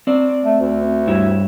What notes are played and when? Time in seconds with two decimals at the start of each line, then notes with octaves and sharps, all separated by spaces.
0.07 C4 D5
0.44 A3
0.60 D2
1.07 G2 E4 C#5